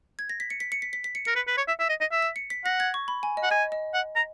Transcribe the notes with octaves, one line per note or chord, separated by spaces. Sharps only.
G#6
A#6
B6
C#7
B6
C#7
B6
B6
B6
C#7
A#4 C#7
B4
B4
C#5
E5
E5
D#5
D#5
E5
B6
C#7
B6
F#5 A#6
G#6
C#6
B5
G#5
D#5
F#5
D#5 G#5
D#5
F#5
A#5